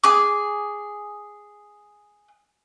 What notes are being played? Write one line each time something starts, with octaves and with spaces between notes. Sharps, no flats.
G#4 D6